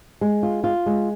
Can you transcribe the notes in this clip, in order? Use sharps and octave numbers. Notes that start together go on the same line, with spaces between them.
G#3
F4
F4
G#3